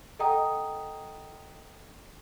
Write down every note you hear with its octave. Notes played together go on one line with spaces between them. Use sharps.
A4 D#5 F#5 G5 A#5 D#6